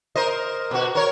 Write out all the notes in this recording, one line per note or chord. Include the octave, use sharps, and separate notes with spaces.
A#4 C5 D#5
B2 F#4
A#4 C#5